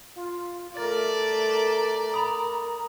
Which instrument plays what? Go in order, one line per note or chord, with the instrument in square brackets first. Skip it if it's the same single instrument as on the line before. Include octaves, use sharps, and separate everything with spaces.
[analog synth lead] F4
[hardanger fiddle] A3 D5 [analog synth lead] A#4 [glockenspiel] A6
[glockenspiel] A#5 B5 D#6